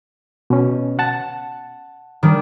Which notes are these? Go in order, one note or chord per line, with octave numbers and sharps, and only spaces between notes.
B2 C#4
F#5 A5
D#3 G3 D4